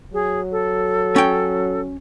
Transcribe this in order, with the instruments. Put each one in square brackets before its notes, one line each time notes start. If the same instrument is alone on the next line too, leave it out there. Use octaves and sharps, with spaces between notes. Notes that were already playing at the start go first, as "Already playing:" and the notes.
[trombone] F#3 [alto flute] G#4
[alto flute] A4
[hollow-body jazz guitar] C#4 G5